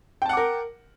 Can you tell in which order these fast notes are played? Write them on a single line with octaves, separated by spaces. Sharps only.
G5 A5 F#5 D6 A#4